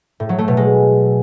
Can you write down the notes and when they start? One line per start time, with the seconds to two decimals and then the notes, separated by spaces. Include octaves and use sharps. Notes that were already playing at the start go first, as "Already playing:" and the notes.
0.20 A2
0.29 F#3
0.38 A3
0.48 B2
0.57 G#3